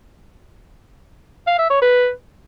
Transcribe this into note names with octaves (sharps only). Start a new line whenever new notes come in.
F5
E5
C#5
B4